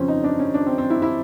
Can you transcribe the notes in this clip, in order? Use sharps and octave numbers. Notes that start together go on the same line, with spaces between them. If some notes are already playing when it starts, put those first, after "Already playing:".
Already playing: F2 C#3 F3 C4 C#4
D#4
D4
C#4
D4
C4
C4
E4
E4